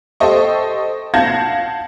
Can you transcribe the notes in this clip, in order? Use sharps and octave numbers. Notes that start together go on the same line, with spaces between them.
G4 A4 C5 D#5 C#6
F5 F#5 A5 G6 G#6 A#6